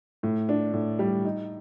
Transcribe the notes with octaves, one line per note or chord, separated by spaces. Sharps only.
A2
D4
A2
G3
D#4